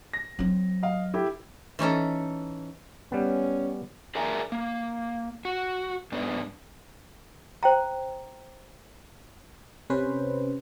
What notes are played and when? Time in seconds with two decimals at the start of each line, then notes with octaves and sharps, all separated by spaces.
0.13 A#6
0.39 F#3 C4
0.83 D#5 F5
1.14 E4 G4 A4
1.79 E3 C#4 D#4 A4
3.12 G3 B3 C#4
4.15 G#4 A#4 D5 E5 G#5 A#5
4.52 A#3
5.45 F#4
6.12 G#2 B3 D4
7.63 C5 G5 A#5
9.90 C3 C#4 B4 C5